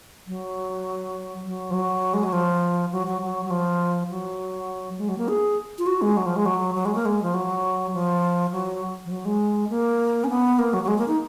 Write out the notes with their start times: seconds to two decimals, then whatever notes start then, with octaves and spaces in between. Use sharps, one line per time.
0.27 F#3
1.45 F#3
1.70 F3
1.74 F#3
2.14 G#3
2.24 F#3
2.33 F3
2.92 F#3
3.07 F#3
3.22 F#3
3.45 F#3
3.50 F3
4.10 F#3
4.98 G#3
5.09 F#3
5.18 A#3
5.28 G#4
5.78 F4
5.87 F#4
6.02 G#3
6.17 F#3
6.26 F3
6.36 G#3
6.46 F#3
6.75 F#3
6.85 G#3
6.95 A#3
7.05 G#3
7.23 F3
7.34 F#3
7.93 F3
8.52 F#3
9.05 F3
9.11 F#3
9.25 G#3
9.70 A#3
10.24 C#4
10.30 B3
10.59 A#3
10.73 F#3
10.84 F#3
10.88 G#3
10.98 A#3
11.08 D#4